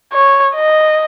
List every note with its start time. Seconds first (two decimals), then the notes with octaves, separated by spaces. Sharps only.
0.13 C#5
0.55 D#5